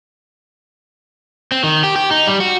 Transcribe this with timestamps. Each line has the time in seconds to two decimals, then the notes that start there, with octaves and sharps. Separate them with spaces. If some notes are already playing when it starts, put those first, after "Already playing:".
1.52 C4
1.64 D#3
1.84 G4
1.96 G4
2.11 D#4
2.27 G3
2.40 F#4